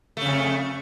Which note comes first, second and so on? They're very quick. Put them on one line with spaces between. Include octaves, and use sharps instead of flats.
A3 C#3 F2